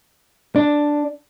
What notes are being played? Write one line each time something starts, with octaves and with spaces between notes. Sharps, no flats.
D4